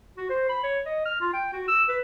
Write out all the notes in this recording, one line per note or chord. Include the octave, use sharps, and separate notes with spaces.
F#4
C5
B5
C#5
D#5
F6
F4
G5
F#4
E6
B4